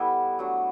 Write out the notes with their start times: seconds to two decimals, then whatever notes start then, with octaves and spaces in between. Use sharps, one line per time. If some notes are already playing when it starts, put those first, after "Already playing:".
Already playing: G3 B3 E4 A4
0.39 F#3 A3 D4